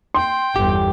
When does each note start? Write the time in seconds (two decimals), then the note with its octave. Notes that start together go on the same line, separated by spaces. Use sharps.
0.14 G5 C6
0.56 G1 E2 G4